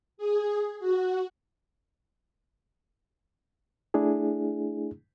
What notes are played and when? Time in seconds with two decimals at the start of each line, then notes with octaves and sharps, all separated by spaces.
0.17 G#4
0.80 F#4
3.94 A3 D4 E4 G#4